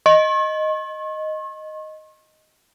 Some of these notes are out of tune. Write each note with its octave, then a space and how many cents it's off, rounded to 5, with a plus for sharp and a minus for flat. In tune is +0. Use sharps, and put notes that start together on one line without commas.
D#5 +0 C#6 -45